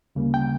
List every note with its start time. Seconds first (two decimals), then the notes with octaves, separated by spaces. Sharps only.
0.15 D2 C#3 G3 A#3
0.34 G5